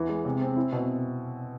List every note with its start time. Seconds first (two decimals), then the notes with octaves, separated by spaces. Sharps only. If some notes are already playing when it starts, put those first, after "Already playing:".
Already playing: E2 E3
0.09 G#3
0.25 C3
0.41 C4
0.57 E4
0.72 B2